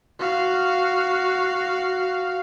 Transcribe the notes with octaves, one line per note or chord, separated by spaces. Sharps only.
F#4 F5